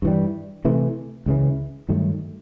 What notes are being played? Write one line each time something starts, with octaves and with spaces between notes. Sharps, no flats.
G2 E3 G3
C3 E3 A3
C#2 C#3 E3
G2 D#3 F#3 A3